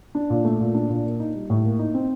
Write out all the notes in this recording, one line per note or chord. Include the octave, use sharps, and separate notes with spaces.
D4
A#2
A3
A#2
D4
A#2
A#3
D#4
G3
A2
A#3
D#4
C4